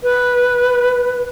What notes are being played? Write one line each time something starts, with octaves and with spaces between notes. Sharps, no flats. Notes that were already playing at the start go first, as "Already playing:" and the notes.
B4